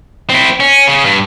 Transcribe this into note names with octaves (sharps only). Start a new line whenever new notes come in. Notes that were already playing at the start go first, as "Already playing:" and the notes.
C4 E4
C#4
C#3
G2